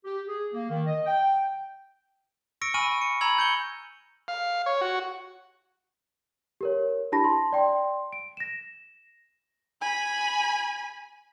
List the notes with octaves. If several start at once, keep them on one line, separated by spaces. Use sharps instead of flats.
G4
G#4
A#3
D#3
D#5
G5
C#6 E6 A#6 C#7 D7
G#5 B5 C#6 E6 F6 D#7
C#7
A#5 B5 E6 G#6 F#7
G6 C#7 G7
F5
C#5
F#4
G4 A#4 C#5
D4 E4 G4 A5 B5 A#6
A5 C6
D5 G5 C6
D7
A#6 E7
G#5 B5